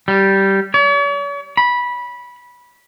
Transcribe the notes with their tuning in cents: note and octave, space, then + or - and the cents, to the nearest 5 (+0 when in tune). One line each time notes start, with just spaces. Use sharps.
G3 -10
C#5 +45
B5 -15